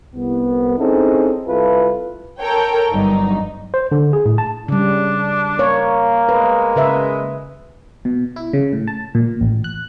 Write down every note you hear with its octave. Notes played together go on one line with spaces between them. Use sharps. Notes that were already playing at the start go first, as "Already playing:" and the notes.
C2 B3
C4 C#4 D#4 E4 G#4 A4
C2 E4 F4 A4 B4
A4 A#4 C#5 G5
G1 G2 F#3 D#4
C5
D3
G#4
A2
A5
C#3 G3 D4
A#3 C#5
G#3 B4
C#3 B4 E5
B2
E4
C#3
A2
A5
A#2
A1
F#6